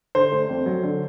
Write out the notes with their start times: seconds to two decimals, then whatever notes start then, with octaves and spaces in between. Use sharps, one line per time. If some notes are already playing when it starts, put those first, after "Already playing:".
0.15 D3 C5
0.32 A3
0.49 F2
0.66 F#3
0.83 D3